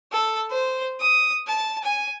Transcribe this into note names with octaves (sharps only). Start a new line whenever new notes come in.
A4
C5
D#6
A5
G#5